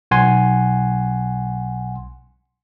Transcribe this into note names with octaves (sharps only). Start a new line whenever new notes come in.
B1 F#5 G#5 C6